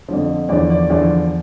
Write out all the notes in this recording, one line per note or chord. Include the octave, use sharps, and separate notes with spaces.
F2 D3 F3
E2 D3 F3 D5
D5
E2 D3 F3 D5